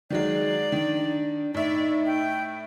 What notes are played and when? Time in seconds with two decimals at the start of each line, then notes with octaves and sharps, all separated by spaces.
0.10 D#3 F#3 G#3 D5
0.72 D#3 D4
1.54 A2 D#4 D5 E5
2.06 G5